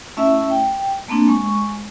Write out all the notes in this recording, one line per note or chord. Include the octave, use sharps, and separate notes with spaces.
A3 C#4 E4 E5
G5
A3 A#3 C4 D4
G#3 C#6